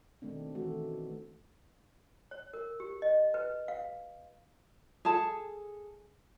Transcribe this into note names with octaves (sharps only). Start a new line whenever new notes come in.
B2 D#3 A3 C4 D4
D#3 E3 A3 F#4 A4
C#5
A#4
G4
D#5
B4
F5
G#4 A4 A5